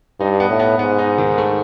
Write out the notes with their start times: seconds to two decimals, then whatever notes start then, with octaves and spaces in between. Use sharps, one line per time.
0.20 G2 D#4
0.40 B3
0.50 A2
0.60 B3
0.79 G#2 B3
0.99 D#4
1.18 D#3
1.38 A3